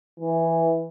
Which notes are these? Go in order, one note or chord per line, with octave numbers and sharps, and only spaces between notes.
E3